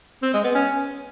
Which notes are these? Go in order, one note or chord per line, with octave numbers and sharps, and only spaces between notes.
C4
G#3
B3
C#4